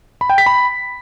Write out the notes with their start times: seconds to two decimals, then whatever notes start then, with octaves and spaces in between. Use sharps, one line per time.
0.21 B5
0.30 G5
0.38 B6
0.46 B5